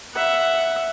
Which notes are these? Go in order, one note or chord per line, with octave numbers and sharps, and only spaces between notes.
E5 F#5